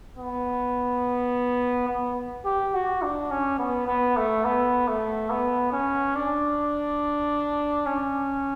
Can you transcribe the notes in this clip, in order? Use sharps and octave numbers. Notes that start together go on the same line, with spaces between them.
B3
B3
G4
F#4
D4
C#4
B3
B3
A3
B3
A3
B3
C#4
D4
C#4